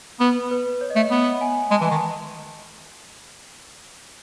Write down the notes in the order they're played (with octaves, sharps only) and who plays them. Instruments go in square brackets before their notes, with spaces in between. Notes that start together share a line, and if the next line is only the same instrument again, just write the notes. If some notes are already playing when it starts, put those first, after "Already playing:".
[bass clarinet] B3 [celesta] B4
[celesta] B4
C#5
D#5
[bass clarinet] A3
[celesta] D#5
[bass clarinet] B3 [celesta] F#5
[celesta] G#5
[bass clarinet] G#3 [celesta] A5
[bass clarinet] E3
D#3
[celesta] A5